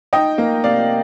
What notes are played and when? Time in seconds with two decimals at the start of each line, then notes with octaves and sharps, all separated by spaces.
0.13 D#4 D#5 G5
0.38 A#3
0.64 C3 D5 F5